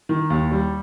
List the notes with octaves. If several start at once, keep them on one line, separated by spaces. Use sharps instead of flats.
D#3
D#2
G3